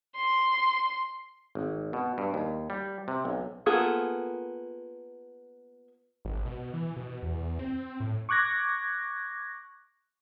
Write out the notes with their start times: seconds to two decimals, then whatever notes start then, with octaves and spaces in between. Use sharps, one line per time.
0.15 C6
1.55 G#1
1.93 B2
2.18 G2
2.34 D#2
2.70 G3
3.08 C3
3.25 B1
3.66 A#3 B3 F4 G#4 A4
6.25 G#1
6.45 B2
6.73 E3
6.96 B2
7.23 E2
7.59 C4
8.00 A2
8.29 C#6 D6 F#6 G#6 A#6